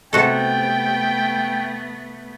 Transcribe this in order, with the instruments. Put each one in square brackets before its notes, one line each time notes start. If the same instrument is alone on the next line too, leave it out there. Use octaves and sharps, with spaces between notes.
[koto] C3 F#4 A4 [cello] A3 B3 [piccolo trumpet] G5